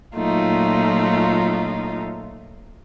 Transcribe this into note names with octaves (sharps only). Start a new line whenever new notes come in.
A#2 F#3 A3 D#4 F4